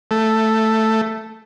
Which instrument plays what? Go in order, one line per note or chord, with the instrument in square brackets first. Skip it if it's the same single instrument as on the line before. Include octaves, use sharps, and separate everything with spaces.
[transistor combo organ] A3